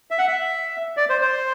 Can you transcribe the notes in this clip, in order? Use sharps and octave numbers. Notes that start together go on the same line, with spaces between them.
E5
F#5
E5
D5
C5
C5